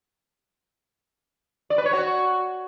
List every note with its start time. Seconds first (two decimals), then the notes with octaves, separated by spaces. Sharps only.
1.70 D5
1.78 B4
1.85 C#5
1.93 F#4